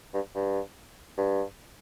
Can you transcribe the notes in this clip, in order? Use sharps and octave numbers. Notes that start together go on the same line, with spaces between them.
G2
G2
G2